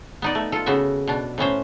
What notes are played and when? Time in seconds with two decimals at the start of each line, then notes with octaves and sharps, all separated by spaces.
0.22 B3 D#4 D5
0.35 A3
0.52 F4 A4
0.66 C#3 B3 F#4 E5
1.07 B2 D4
1.38 A2 B3 C#4 C5